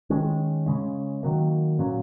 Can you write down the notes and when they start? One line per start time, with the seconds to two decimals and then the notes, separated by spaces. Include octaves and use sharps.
0.10 D#3 G#3 C#4
0.66 C#3 G#3 C#4
1.23 D#3 F#3 A#3
1.79 A#2 F#3 C#4